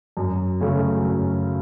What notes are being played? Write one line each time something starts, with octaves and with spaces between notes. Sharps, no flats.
F#2
C#3 F#3 A3 C#4
F#2